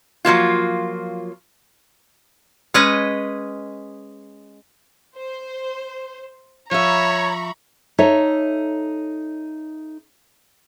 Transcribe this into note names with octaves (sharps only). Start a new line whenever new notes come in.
F3 F#3 A#3 F4
G#3 C#4 B4 D#5
C5
F3 C#5 E5 A#5 B5 C#6
D#4 A4 C#5 E5